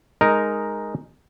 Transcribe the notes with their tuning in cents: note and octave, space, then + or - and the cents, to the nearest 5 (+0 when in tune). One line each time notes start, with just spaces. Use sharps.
G#3 +0 D#4 +0 A#4 +0